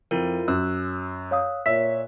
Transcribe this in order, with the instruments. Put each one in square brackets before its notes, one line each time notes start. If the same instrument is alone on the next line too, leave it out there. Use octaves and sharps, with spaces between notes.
[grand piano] F2 [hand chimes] E4 F4 A#4
[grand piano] F#2 [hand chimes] E6 F#6
[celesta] C#5 F5 D#6
[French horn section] A#2 C#5 [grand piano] E5 [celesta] B6